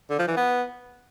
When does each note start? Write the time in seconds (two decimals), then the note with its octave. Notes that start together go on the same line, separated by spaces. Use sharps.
0.10 D3
0.19 F3
0.28 E3
0.36 B3